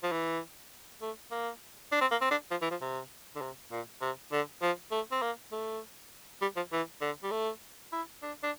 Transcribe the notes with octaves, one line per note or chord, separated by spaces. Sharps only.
F3
E3
A3
A#3
D4
C4
A#3
C4
D4
F3
E3
F3
C3
D3
C3
A#2
C3
D3
F3
A3
C4
A#3
A3
G3
F3
E3
D3
G3
A3
E4
D4
D4